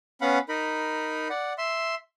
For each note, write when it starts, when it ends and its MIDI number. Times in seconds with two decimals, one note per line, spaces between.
0.21 0.39 59
0.21 0.39 61
0.21 0.39 77
0.21 0.39 78
0.21 0.39 83
0.49 1.28 63
0.49 1.28 70
0.49 1.28 83
1.30 1.53 74
1.30 1.53 78
1.58 1.95 76
1.58 1.95 84